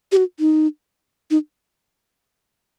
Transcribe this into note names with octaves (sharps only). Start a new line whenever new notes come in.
G4
F#4
D#4
D#4